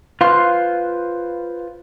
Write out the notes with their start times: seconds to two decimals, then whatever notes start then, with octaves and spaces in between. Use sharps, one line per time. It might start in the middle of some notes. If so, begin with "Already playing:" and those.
0.21 F4 B4 C5 F5 C6 F#6